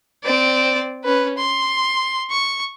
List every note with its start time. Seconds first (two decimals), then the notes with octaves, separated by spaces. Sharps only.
0.24 C4 D5
1.05 C#4 B4
1.38 C6
2.31 C#6